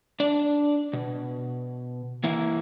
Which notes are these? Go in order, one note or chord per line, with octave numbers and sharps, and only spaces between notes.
D4 D5
B2
E3 A#3 E4